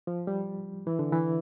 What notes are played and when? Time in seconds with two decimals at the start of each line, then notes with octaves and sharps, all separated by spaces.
0.07 F3
0.27 G3
0.87 E3
0.99 D3
1.12 E3